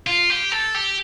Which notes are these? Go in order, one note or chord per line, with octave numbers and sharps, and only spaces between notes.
F4
G4
A4
G4